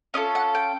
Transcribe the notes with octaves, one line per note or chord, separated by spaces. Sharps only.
C#4 F4 A4 D#5
F#5
G5